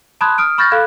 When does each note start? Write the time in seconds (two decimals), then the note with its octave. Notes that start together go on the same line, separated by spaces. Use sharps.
0.21 A5 B5 C6 D#6 F#6 G#6
0.38 D#6 F6 D7
0.58 B5 C#6 F6 G6 A6 A#6
0.71 A4 F5 B5 F#6 G#6